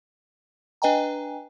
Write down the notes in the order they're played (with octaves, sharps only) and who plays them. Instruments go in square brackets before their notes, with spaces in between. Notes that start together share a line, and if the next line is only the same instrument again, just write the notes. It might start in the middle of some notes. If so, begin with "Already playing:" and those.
[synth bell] D4 B4 D#5 G5 G#5 A#5